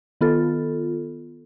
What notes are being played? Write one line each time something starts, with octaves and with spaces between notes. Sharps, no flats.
D#3 B3 F4 A4